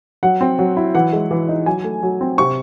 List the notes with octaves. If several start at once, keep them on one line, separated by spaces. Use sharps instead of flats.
F#3 F#5
C4
F#3
E4
E3 F#5
G#3
E3
D#4
F#3 G#5
A3
F#3
C4
C3 C#6